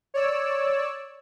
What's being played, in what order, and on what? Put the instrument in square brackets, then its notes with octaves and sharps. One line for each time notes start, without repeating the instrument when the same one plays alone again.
[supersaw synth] C#5 D5 E6